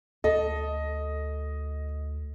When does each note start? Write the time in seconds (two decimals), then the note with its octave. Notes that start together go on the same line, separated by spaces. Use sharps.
0.24 D2 A4 D#5